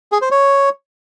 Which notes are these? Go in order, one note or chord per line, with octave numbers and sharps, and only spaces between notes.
G#4
C5
C#5